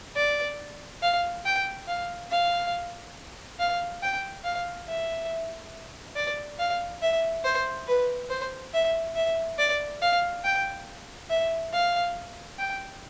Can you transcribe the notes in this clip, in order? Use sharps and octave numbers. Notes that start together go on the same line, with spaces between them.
D5
F5
G5
F5
F5
F5
G5
F5
E5
D5
F5
E5
C5
B4
C5
E5
E5
D5
F5
G5
E5
F5
G5